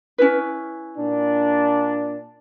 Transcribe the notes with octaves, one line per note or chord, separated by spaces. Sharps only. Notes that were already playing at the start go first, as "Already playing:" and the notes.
C#4 E4 B4
A#2 D4